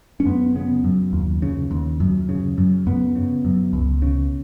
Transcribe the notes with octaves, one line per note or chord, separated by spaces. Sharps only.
C#4
F#2 B3
C#3 B3
F#2
D#2
C#3
D#2
F#2
C#3
F#2
F#2 B3
C#3
F#2
C#2
C#3